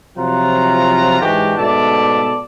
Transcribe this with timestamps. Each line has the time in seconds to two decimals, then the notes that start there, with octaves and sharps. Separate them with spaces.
0.18 C3 F3 F#3 F4 F#5 A#5
1.22 G#2 E3 G#3 D4 F#4 G4
1.58 G#2 B2 A3 D5 E5 A5